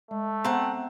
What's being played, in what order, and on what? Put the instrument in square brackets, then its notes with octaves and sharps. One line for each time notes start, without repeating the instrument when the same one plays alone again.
[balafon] G#3 [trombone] A3
[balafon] B3 C5 [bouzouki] C4 F#5 [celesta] G5 A5 A#5